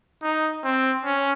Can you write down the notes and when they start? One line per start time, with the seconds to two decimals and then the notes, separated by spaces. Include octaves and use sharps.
0.22 D#4
0.64 C4
1.04 C#4